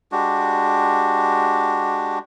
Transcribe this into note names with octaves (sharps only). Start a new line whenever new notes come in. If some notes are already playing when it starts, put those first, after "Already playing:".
G#3 D4 F#4 G4